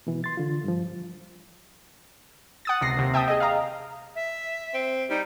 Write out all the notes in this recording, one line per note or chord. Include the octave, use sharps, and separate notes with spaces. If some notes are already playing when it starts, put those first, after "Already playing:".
B2 E3
C6 A6
D3 F4
G2 F3
F#5 D#6 A6
C#2 C3 A#6 C7
D#2 C3
E5 G5 A5 D#6
G#4 D#5
F5 A#5
E5
C4
G3 D#4